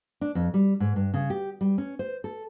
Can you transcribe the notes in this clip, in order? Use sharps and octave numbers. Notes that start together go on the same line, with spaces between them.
D4
F2
G3
G#2
G2
C#3
G4
G3
C#4
C5
A4